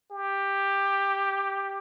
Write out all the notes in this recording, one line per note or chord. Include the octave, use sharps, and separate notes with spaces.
G4